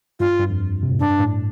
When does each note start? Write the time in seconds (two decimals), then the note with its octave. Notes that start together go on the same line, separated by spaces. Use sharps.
0.20 G2 F4
0.39 G2
0.50 F2
0.83 C3
0.91 A2
1.00 G2 D4
1.10 G2
1.19 A2